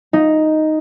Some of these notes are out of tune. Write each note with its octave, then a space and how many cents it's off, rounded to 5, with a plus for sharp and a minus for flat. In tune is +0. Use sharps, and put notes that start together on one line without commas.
D#4 +0